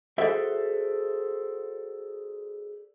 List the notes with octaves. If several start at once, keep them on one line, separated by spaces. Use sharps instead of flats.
F#4 G#4 A4 C5 D5 E5